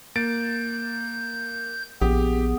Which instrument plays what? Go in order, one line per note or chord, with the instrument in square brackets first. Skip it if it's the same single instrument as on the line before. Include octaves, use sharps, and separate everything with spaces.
[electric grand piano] A#3 A6 D7 [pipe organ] G6
[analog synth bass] A#1 [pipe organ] B3 G#4 [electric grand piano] G4